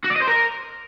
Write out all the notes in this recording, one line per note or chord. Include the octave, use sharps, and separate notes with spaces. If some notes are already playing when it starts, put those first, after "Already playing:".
F#4
D5
D#5
C5
A#4